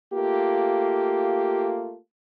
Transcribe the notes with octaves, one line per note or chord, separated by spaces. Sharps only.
A3 A#3 F4 G4